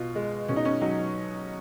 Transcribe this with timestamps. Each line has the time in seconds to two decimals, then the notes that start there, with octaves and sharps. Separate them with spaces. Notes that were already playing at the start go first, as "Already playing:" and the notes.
Already playing: B2 F4
0.15 G#3
0.48 B2 C#4
0.56 D#4
0.65 C#4
0.81 F#3 D#4